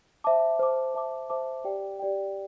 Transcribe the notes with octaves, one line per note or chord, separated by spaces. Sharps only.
C5 E5 A5 D6
C5 E5 A5 D6
C5 E5 A5 D6
C5 E5 A5 D6
G4 D5 G5
G4 D5 G5